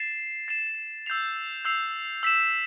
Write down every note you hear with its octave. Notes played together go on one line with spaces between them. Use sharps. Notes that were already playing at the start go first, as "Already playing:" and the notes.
Already playing: A6 C7 E7
A6 C7 E7
E6 G6 C7 F7
E6 G6 C7 F7
E6 B6 E7